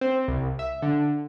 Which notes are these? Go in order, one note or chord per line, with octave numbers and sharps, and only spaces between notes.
C4
C2
E5
D3